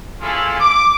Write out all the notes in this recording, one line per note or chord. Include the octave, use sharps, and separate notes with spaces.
A#3 C#4 E4 F4 G#4 A4
D6